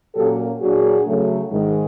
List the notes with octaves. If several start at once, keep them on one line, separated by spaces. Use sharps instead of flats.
A#2 F#3 A#3 C#4 G4 A4
A#2 F#3 A#3 D4 F#4 G#4
C#3 F#3 A3
G#2 D#3 G#3